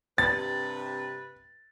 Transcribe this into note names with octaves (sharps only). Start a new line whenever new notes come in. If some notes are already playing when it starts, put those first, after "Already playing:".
G2 C3 B4 A6